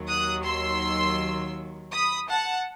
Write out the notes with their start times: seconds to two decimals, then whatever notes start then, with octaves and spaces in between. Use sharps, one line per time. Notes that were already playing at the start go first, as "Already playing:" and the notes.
Already playing: D#2 D#3 F#3
0.08 D#6 F#6
0.45 C6 E6
1.92 B5 D#6
2.29 F#5 A5